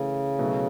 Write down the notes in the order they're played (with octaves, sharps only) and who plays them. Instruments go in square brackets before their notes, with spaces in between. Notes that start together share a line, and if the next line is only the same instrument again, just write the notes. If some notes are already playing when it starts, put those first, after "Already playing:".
Already playing: [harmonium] C#3 [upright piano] E3 A3
[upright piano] B2 F#3 A3 E4